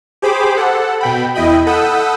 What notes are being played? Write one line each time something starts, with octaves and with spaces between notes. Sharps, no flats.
G4 G#4 C5 B5 D6
A4 F#5
B2 G5 B5
E2 E4 D#5 G5 B5
A4 F#5 B5 D#6 E6 G6